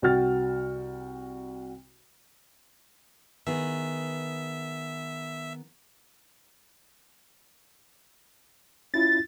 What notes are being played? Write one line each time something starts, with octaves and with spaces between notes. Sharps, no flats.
C2 F#4 G5 F6 A6
D#3 B3 G#4 E5
C#4 E4 F4 A6